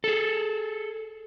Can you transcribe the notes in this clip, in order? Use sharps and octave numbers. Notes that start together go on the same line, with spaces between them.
G#4 A4